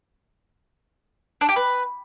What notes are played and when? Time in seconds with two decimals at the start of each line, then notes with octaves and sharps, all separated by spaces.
1.41 D4
1.49 G4
1.56 B4